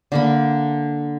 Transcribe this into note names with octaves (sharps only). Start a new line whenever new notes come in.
D3 A#3 B5